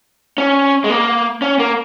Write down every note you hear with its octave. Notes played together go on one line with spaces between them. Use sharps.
C#4
G#3
A#3
C#4
A#3